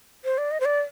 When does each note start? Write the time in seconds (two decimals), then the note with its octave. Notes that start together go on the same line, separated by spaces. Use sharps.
0.25 C5
0.38 D5
0.51 D#5
0.60 C5
0.65 D5